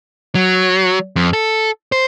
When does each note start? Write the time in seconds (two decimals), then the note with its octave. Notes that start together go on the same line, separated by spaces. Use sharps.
0.35 F#3
1.16 F2
1.33 A4
1.92 C5